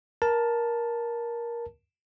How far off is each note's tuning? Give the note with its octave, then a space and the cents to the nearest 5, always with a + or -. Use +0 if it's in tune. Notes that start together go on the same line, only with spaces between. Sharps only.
A#4 +15 A5 +0